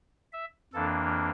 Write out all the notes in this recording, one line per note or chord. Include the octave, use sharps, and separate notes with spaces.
E5
F2 E3 A#3 D4 A4